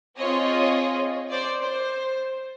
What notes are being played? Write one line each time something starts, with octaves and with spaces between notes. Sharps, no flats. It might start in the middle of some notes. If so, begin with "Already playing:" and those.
C4 F4 G#4 C#5 D#5
C5 D5
C5